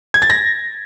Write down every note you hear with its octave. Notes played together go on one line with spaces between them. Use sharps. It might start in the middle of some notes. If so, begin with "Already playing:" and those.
G#6
A6
A#6